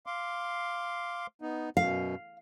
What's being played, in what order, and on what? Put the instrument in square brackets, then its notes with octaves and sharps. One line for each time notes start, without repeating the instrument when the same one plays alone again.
[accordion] F5 C6 D6
B3 D#4
[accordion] F#2 B2 [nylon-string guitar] F5